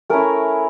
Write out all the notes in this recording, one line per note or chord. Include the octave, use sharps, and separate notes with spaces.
A3 C#4 E4 A#4